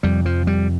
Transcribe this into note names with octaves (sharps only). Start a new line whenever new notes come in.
F2 C3 G3
F3
G3